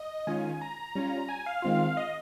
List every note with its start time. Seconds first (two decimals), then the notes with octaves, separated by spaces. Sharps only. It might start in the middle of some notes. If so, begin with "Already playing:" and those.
Already playing: D#5
0.27 D#3 G#3 C#4 F4 G#5
0.61 A#5
0.95 G3 C#4 F4
1.29 G#5
1.46 F5
1.62 D#3 G#3 C4 F4
1.97 D#5